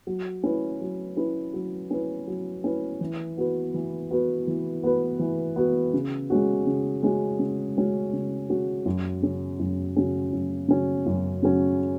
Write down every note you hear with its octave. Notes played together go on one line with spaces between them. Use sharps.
F#3
C#4 E4 B4
F#3
C#4 E4 B4
F#3
C#4 E4 B4
F#3
C#4 E4 B4
E3
B3 F#4 B4
E3
B3 F#4 B4
E3
B3 F#4 B4
E3
B3 F#4 B4
C#3
G#3 C#4 F#4
C#3
G#3 C#4 F#4
C#3
G#3 C#4 F#4
C#3
G#3 C#4 F#4
F#2
C#3 F#3 C#4
F#2
C#3 F#3 C#4
F#2
C#3 F#3 C#4
F#2
C#3 F#3 C#4